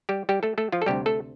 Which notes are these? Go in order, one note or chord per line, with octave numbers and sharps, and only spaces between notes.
G3 G4
G3 G4
A3 A4
A3 A4
F3 F4
A4
D2 C3 G3 G4
A3 A4